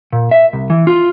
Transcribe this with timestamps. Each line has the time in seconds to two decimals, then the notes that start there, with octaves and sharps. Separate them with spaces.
0.13 A#2
0.31 E5
0.53 C2
0.70 E3
0.87 F4